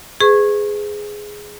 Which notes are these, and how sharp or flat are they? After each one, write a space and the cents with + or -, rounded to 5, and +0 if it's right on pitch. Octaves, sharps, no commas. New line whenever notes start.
G#4 +0 B4 +40 C#6 -25